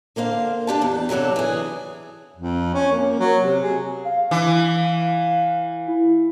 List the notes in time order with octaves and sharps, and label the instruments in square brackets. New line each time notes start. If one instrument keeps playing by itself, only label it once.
[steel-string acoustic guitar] D3 A#3 C5 F5
D4 G4 A5
E2
C3 E3 F#3 D4 A4
E3 G#4
[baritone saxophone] F2
C#4
A#3
F#3
C3
G#4
[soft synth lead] F5
[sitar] E3
[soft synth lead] E4